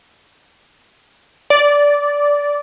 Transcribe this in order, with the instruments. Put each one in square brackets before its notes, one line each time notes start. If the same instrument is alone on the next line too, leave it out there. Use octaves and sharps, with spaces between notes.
[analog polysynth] D5